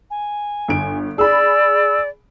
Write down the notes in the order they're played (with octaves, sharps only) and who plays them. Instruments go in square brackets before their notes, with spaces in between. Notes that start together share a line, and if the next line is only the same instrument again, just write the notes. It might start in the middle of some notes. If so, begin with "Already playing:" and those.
[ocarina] G#5
[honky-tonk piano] G1 D7
[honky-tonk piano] G#4 B5 [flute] D5 [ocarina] E6